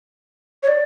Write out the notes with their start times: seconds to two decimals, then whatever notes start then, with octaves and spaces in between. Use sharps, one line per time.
0.63 C#5
0.68 D5